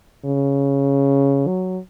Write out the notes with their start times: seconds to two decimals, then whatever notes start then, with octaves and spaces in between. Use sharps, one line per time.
0.25 C#3
1.47 F#3